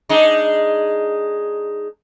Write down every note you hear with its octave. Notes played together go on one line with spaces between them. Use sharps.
G#3 D4 D#4